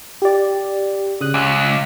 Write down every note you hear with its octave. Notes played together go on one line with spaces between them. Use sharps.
G4 D5
C#3 D#6 F#6
C#2 D6 E6 F#6